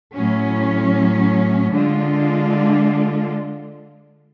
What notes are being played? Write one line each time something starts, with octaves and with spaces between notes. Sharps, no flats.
A2 F#3 C#4
D3 G#3 D4 F4